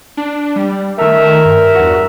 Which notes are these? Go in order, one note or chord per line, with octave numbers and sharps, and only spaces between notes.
D4
G3
D#3 A3 A#4 E5
G2
E2 G2 F#4